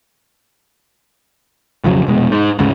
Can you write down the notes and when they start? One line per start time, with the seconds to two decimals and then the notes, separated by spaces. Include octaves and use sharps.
1.84 B1 F2 C#3 F#3
2.07 F1 B2 G#3
2.32 G#2
2.59 D2 G#2 C#3